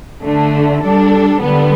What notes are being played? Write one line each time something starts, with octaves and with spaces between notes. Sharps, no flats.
D3 A3 D4
G3 D4 A4
D3 G3 B3